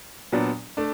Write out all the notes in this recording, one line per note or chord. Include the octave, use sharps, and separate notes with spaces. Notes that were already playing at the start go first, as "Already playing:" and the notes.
A#2 F#3 B3 D4
A3 D4